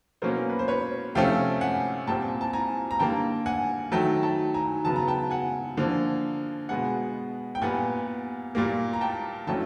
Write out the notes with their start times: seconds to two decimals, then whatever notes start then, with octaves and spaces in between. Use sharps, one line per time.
0.22 B2 F#3 A#3 C#4 A#4 C5
0.49 B4
0.59 C5
0.68 B4 C#5
1.15 C3 F3 A3 C#4 F5 G5
1.61 F#5 G#5
2.07 A#2 G3 C4 G5 A5
2.28 G#5
2.41 A5
2.53 G#5 A#5
2.91 A#5
2.99 D3 G3 A#3 G5 A5
3.46 F#5 G#5
3.92 D#3 F#3 A3 G5 A5
4.23 G5 A5
4.54 G#5 A#5
4.85 C#3 F#3 B3 A5
4.96 A#5
5.08 G5 A5
5.30 F#5 G#5
5.77 D3 F3 A#3
6.69 B2 G#3 B3 F#5 G#5
7.55 G5
7.62 A#2 G3 B3 F#5 G#5
8.55 A#2 G3 A#3
8.93 A#5
9.01 G5 A5
9.47 D3 F#3 A3 C#4 G5 A5